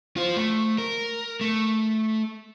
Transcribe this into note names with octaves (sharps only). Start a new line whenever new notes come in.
F4 C5
A3
A#4
A3